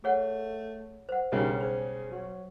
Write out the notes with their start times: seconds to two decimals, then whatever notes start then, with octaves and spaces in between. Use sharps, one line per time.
0.04 A3 G#4 C#5 F#5
1.09 C5 F#5
1.32 B1 C#3 G3 A#4
1.61 G#4 C5
2.11 F#3